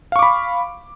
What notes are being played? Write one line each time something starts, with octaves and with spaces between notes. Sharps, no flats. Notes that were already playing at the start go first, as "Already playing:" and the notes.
F5 B5 C#6 D6